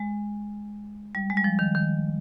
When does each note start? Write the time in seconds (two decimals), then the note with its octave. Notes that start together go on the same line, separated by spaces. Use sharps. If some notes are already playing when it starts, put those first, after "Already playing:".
Already playing: G#3
1.15 G3
1.30 G#3
1.37 G3
1.44 F3
1.59 D#3
1.75 D#3